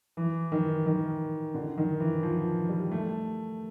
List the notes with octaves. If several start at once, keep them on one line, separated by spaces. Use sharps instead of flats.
E3
D#3
D#3
D3
D#3
E3
F3
G3
A3